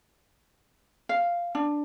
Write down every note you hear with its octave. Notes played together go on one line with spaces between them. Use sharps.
F5
D4